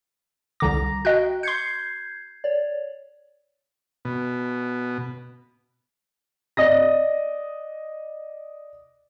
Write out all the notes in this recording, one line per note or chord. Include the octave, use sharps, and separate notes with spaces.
C2 D3 A#5 D6 A#6
F#4 D#5 G5 F#6
C6 G6 G#6 C7 C#7
C#5 D5
B2
D5 D#5 D#6 A#6